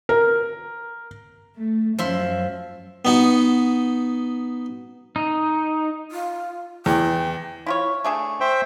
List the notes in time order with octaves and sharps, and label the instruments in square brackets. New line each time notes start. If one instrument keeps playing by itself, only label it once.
[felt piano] A#4
[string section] A3
[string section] F#2 [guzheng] F3 E5 C6
[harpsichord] B3 D#4 F#4
[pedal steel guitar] D#4
[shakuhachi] F4
[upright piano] E2 [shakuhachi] G5
[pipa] E4 F4 C#5
A3 D4 G#4
[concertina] C5 E5 G5